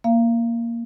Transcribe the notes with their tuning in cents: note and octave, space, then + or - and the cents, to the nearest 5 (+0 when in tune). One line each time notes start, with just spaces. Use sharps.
A#3 +0 F5 -35